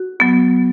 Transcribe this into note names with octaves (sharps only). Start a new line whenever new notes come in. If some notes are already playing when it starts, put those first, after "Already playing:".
Already playing: F#4
F#3 B3